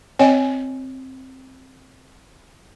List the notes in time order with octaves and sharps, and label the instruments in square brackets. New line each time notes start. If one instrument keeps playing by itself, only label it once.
[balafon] C4 C#5 D#5 G5 G#5